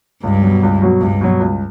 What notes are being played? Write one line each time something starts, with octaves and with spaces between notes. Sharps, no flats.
C#2 G2
B2 F#3
C#2
B2 F#3
C#2 G2
B2 F#3
C#2